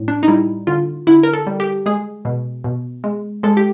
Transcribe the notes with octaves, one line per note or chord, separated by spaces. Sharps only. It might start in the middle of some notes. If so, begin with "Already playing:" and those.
Already playing: A2
D4
D#4
G3 E4
D3 F4
D3 E4
A#4
A4
G3
G4
G#3 G#4
B2
B2
G#3
G#3 A4
G4